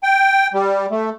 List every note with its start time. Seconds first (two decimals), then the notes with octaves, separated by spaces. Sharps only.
0.03 G5
0.54 G3
0.91 A3